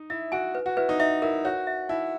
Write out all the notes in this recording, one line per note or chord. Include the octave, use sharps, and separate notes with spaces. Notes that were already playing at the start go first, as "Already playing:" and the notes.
Already playing: D#4
E4 E5
F#4 G#5
B4
F#4
E4 B4
D#4
D#4 E5
E4 A#4
F#4 C#5
E5
D#4 E4